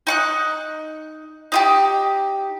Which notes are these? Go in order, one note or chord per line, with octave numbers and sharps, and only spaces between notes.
D#4 C#6 F#6
D#4 F4 G4